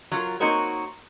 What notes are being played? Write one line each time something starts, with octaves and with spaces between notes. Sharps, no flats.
F#3 F4 A#4
A#3 C4 D#4 F#4 A#4 C#5